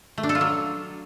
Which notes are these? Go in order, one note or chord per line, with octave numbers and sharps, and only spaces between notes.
A3
D4
A4
F4
F#3